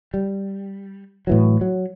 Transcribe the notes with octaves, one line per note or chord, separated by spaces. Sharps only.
G3
A2 E3 F#3
F#3